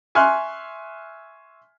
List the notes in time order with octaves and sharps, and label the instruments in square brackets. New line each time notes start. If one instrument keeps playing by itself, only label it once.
[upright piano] E5 G#5 C6 C#6 F6 F#6